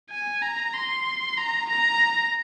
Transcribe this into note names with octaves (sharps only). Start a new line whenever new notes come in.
G#5
A#5
C6
A#5
A#5